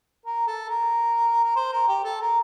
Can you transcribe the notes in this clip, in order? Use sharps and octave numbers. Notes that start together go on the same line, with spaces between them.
A#4
A4
A#4
A#4
C5
A#4
G4
A4
A#4